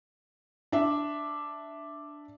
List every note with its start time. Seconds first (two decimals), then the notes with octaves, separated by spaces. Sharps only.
0.72 D4 E5